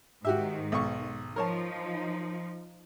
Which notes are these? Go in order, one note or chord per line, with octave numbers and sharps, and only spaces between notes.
G#2 D#3 F#4 G4 E5
B1 C#6
F3 D#4 A#4 C#5 A5